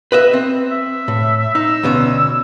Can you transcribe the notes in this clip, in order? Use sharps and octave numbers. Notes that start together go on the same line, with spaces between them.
B4 D#5 E5
C4
E5
A2
D#4 E6
D2 B2 C#4